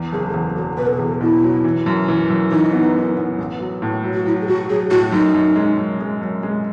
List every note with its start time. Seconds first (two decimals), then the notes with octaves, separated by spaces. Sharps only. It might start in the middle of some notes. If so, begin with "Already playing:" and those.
Already playing: E2
0.12 F#1 G#4
0.29 A4
0.34 E2 G#4
0.55 F#3 A4
0.77 B2 B4
0.88 A4
0.98 E2 G#4
1.08 A4
1.21 B2 E4
1.43 F#3
1.64 E3
1.86 F#2
2.08 E3
2.30 F#2
2.52 E3 D#4
2.73 B3
2.95 F#2
3.17 B3
3.38 A1
3.60 F#3
3.82 A2
4.03 F#3
4.14 F#4
4.25 F#3 E4
4.41 G#4
4.48 F#3 F#4
4.69 F#3 G#4
4.91 A2 F#4
5.12 F#2 D#4
5.35 F#2
5.56 G#3
5.78 F#2
6.00 G#3
6.22 F#2
6.43 G#3